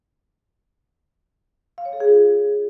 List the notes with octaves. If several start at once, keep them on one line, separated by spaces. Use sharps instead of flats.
F5
C#5
A4
G#4
F4